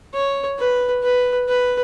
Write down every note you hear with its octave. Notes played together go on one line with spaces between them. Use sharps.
C#5
B4
B4
B4